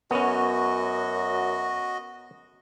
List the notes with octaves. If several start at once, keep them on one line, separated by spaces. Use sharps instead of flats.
F#2 B3 C#4 F#4 D#5